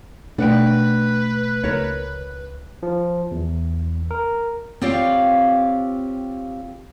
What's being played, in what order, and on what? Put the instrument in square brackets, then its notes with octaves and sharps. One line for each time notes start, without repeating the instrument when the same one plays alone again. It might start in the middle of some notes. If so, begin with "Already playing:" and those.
[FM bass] B2 [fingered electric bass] A3 [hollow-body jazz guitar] D4 F#5 G5 [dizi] B4
[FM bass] C#2 [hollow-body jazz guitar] A#4 C#5
[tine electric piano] F3
E2
A#4
[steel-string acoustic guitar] C4 F4 G4 C#5 D5 F5